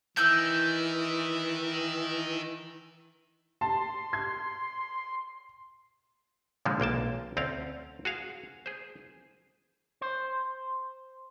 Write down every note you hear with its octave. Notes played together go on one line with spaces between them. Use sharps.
D#3 E3 E6 G6
A5 C6
G#6
A#2 D3 E3 F3 G3 G#3
B1 A#3 G5 A5
D2 C4 C#4 D5 F5
F#4 G#4 F5
G#4 C5
C5